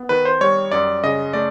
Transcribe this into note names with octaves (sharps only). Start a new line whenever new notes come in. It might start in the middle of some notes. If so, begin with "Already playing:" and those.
Already playing: B3
D#3 B4
C5
G3 C#5
F#2 D5
C#3 D#5
A3 D5